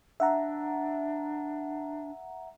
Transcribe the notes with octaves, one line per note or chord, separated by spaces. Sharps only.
D4 E5 F#5 A#5